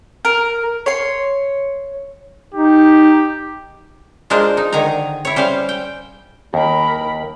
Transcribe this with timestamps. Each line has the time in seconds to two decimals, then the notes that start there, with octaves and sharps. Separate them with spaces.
0.25 A#4
0.86 C#5 C6
2.54 D#4 G4
4.30 G#3 D4 F4 A#4 C5
4.57 D#4
4.73 D3 D#3 G#5 A#5
5.25 E4 C#5
5.36 G3 C#4 C5 F5
5.69 G5
6.54 D#2 A#4 B5